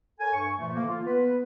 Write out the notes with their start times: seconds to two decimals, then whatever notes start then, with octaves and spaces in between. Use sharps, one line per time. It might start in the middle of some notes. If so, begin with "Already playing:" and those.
0.20 A4 A#4 C#5 G#5
0.34 G2 C#6
0.58 A#2 E3 F3 A3
0.73 D3 E3 F3 A#3
0.88 F4
1.06 B3 B4